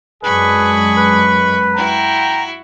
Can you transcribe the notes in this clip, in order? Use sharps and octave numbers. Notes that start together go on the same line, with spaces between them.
F#2 G#3 D4 G#4 B4 B5 C#6
B4
E4 F#4 G5 A#5